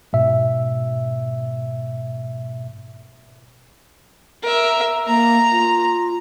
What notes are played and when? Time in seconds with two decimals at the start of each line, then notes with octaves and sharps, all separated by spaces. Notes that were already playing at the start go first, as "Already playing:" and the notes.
0.13 G#2 B2 E5
4.43 A#4 E5
5.07 A#3 A#5
5.52 F4